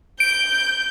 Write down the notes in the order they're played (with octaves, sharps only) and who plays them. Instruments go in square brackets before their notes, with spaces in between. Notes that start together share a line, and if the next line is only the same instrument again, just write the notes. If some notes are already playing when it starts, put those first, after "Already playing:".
[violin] G6 [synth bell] D7